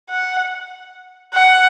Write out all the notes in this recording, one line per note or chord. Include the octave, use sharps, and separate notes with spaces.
F#5
F#5